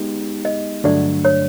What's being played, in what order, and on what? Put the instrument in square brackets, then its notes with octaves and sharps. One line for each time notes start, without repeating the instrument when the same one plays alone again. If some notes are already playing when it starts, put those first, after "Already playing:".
Already playing: [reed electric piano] G#3 B3 D#4 G4
[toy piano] D#5
[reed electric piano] G2 D3 F#3 A3 D4 [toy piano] D5
[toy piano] C#5